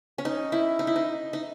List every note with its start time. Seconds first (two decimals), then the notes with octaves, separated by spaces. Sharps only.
0.18 C#4
0.25 D#4
0.52 E4
0.79 D#4
0.87 E4
0.96 D#4
1.33 D#4